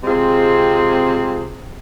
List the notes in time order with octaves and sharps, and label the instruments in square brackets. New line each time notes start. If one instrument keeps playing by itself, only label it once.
[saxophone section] C3 G#3 C4 F4 G#4